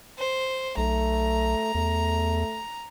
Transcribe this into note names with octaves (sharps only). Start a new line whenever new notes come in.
C5
B1 A3 A#5
E2 A3